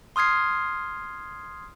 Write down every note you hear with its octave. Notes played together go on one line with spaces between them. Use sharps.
C6 D#6 F6 G#6 C7